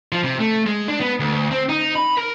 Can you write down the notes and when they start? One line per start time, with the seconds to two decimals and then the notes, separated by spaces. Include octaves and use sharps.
0.12 F3
0.24 C3
0.40 A3
0.67 G#3
0.88 D4
1.00 B3
1.20 D2
1.51 C4
1.69 D#4
1.95 B5
2.18 A#4